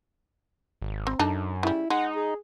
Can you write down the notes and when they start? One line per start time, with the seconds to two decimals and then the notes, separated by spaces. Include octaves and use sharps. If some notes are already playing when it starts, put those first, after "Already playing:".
0.82 G#1
1.07 C4
1.19 F#2 D4 D#4 A4
1.63 C#3 G3 E4
1.90 G#3 D#4 F#5
2.16 G#4